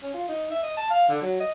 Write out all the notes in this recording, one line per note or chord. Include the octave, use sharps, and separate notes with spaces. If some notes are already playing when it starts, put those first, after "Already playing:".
C#4
F4
D#4
E5
D#5
A5
F5
D3
F#3
D#5